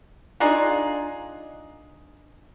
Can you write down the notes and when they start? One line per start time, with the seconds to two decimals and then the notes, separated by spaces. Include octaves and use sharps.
0.40 D4 D#4 F4 G#4